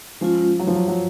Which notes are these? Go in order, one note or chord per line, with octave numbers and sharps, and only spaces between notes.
F3 G#3 C#4 F4
F#3
F3
F#3
F#3